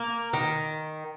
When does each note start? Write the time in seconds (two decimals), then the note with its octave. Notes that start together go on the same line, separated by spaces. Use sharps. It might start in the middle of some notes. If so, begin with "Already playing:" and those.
Already playing: A#3
0.33 D#3